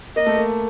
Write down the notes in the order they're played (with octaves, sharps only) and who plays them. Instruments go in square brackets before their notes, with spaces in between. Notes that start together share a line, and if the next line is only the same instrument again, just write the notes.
[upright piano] A#3 [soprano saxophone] D#5
[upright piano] A3
A#3